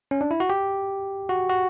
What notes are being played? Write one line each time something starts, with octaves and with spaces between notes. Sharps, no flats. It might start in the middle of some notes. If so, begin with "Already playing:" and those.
C#4
D4
E4
F#4
G4
F#4
F#4